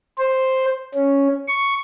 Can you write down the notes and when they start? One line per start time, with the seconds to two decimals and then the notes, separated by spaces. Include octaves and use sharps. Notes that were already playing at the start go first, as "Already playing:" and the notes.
0.18 C5
0.94 C#4
1.48 C#6